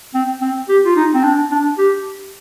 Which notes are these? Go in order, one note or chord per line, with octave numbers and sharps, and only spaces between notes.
C4
C4
G4
F4
D#4
C4
D4
D4
G4